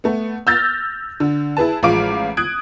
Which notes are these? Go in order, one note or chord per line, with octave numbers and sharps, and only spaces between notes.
A3 B3
E6 F6 G6 A6 A#6
D3
E4 G#4 B4 A5
A1 F3 G#3 F5 D6 D7
D#6 F#6 G#6 D7